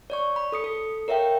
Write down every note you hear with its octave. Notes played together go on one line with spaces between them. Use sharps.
C#5 D5 C#6
B5
A4 D#6 C#7
A4
A#4 C#5 E5 F5 G5